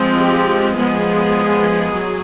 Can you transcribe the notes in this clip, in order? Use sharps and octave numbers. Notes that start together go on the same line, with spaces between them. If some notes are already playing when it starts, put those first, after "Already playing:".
Already playing: F3 G#3 C4
G4
F3 G#3 B3 G#4
F#3